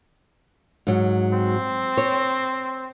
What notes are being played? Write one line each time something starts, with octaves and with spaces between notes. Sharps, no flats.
G#2 F#3
C4
C#5